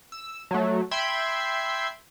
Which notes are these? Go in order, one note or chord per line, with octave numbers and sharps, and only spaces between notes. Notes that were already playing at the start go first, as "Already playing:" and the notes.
E6
F#3 A3
E5 G5 B5 C6 G#6